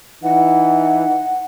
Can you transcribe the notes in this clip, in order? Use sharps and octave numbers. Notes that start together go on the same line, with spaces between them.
E3 D#4 F#5